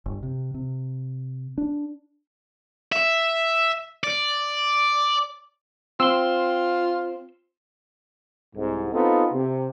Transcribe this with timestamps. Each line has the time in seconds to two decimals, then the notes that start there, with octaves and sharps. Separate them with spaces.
0.06 G1
0.23 C3
0.54 C3
1.58 D4
2.92 E5
4.04 D5
6.00 C4 F4 C6 E6
8.56 C2 G#2
8.92 B3 C4 D#4 F4 A4
9.33 C3